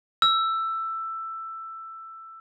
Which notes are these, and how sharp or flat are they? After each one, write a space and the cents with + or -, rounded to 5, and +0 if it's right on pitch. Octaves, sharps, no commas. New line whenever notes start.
E6 +10